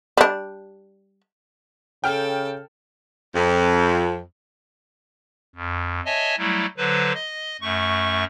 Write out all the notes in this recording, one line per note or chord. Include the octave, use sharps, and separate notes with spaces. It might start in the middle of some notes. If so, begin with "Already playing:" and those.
G3 D4
C#3 A4 G5 F6
F2
F2
C#5 D#5 E5 G#5 A5
F#3 G3 A3 E4
D3 F#3 B4 C5
D#5
F#2 A3 C#6